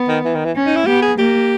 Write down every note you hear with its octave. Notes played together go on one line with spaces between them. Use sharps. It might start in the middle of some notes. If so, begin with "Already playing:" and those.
Already playing: B3
D#3
E3
D#3
E3
C#4
D#4
E4
B3 G4
G#4
A#3 G4